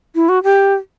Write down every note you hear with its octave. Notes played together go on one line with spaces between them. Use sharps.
E4
F#4
G4